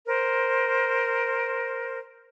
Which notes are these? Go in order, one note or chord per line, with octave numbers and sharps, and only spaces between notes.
A#4 C5